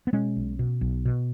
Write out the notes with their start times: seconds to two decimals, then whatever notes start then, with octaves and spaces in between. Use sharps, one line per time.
0.07 B3
0.13 B2 G#3 C#4
0.36 B1
0.59 B2
0.81 B1
1.05 B2